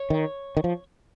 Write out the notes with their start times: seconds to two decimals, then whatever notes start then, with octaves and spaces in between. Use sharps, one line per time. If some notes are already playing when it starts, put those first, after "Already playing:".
Already playing: C#5
0.10 D#3
0.57 D#3
0.64 F3